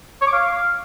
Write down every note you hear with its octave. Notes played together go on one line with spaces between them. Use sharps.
C#5
D6
F5